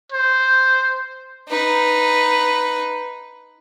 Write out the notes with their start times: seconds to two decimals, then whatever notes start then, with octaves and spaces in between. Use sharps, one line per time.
0.12 C5
1.49 D#4 B4